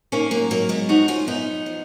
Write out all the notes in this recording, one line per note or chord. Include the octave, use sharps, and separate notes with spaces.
D#3 A#3 C#4
F#3 A#3
G#2 F#3 A#3
G#3 B3
F3 D#4 F#4
C#4 F4
F#2 B3 D#4
F3